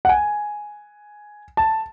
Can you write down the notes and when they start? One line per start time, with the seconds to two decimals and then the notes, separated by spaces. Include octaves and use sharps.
0.05 F#5
0.09 G#5
1.57 A5